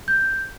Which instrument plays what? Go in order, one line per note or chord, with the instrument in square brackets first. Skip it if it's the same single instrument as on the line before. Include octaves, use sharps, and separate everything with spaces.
[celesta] G6